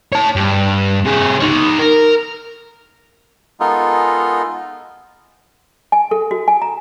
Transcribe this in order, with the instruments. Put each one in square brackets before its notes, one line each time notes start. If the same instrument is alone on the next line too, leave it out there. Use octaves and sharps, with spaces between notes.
[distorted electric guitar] C#5 A5
G2
C3 G#4
D#4 C#5
A#4
[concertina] G#3 B3 D#4 F4 A4 A#4
[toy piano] G#5
A4
F#4
G#5
A#5